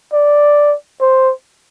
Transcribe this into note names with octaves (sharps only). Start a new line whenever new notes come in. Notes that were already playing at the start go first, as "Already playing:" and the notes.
D5
C5